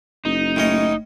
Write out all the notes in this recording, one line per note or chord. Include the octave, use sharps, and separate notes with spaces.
F#1 D#4
A2 C#4 D#5